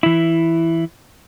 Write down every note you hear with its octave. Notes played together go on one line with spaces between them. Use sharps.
E3 E4